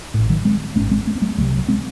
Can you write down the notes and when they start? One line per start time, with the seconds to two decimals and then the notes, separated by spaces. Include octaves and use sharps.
0.14 A1 A2
0.30 D#3 F#3
0.45 G#3 C4
0.76 G#1 G#2 A3 C#4
0.91 G#3 C4
1.07 A3
1.15 C4
1.21 F#3 A3
1.38 C2 C3 F#3 A3
1.69 G#3 C4